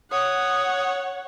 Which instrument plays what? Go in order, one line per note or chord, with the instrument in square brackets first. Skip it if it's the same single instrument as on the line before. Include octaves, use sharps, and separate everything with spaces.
[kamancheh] C#5 F#5 [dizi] D#6